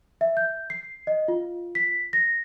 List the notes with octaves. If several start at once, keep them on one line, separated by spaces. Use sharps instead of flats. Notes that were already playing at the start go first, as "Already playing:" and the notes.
E5
G6
C7
D#5
F4
B6
A#6